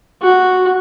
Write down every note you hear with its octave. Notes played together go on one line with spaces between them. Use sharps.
F#4